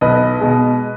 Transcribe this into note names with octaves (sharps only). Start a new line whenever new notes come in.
B1 B4 D#5
B2 G#3